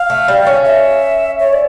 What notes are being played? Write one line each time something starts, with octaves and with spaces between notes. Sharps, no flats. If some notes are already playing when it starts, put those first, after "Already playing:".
Already playing: F5
A3
G3
C#4
E5
C#5
D5